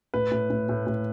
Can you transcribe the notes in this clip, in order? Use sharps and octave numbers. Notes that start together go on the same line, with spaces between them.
A2 B4
A2
A2
A2
A2